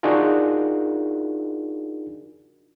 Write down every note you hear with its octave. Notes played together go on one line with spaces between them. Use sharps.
D4 D#4 F4 F#4 G#4 A#4